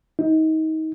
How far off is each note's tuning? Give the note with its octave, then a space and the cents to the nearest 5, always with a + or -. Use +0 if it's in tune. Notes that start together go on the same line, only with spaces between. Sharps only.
D#4 +25